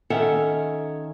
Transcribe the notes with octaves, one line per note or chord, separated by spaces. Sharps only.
D#3 C#4 A4 E5 F#5 G5